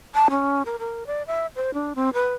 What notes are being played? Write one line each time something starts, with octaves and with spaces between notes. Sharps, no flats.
A5
C#4
A#4
A#4
D5
E5
C5
D4
C4
B4